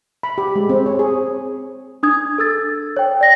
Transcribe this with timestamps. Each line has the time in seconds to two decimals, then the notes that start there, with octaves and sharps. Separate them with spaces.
0.23 B5
0.38 G4
0.56 G#3
0.69 C4
0.86 C#5
0.99 G#4
2.03 D4 D#6 G#6
2.38 A4 E6 A6
2.97 C#5 G5
3.21 D5 A#6